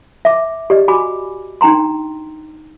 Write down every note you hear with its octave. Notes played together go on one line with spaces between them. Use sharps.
E5 D6
G4 D5 D#5
F#4 G#5 B5 D6
D4 D#4 G5 A#5 C6